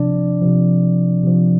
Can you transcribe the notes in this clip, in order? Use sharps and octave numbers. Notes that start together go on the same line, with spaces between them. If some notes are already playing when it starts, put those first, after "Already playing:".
Already playing: C3 F3 D4 D5
C3 F3
C3 F3